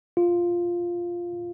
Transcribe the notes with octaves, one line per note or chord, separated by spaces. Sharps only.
F4